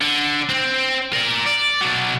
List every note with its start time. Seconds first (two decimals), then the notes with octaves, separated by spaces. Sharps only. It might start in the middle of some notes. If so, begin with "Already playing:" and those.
0.01 D3
0.49 C4
1.13 A#4 D5
1.46 D5
1.81 B2 F#3